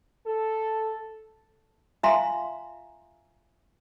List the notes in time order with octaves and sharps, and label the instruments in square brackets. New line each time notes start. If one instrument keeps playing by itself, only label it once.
[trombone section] A4
[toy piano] F4 E5 F5 G#5 A#5 C6